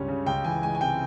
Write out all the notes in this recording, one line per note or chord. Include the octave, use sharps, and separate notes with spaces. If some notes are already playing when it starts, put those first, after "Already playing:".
Already playing: C#2 G2 G3 C#4
C#3
C#2 G5
E3 G#5
G#3 G#5
G#5
C3 G5